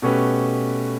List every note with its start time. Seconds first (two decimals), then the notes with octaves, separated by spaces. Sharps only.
0.02 B2 A3 C#4 G4 B4